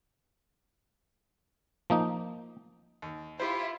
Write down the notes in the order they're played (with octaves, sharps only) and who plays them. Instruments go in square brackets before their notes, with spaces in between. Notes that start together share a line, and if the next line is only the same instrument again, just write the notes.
[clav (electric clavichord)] F3 A#3 D#4
[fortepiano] D#2
[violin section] E4 F4 [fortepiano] G4 C5